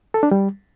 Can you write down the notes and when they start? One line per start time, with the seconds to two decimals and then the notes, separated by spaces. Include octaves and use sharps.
0.14 A4
0.23 D4
0.31 G3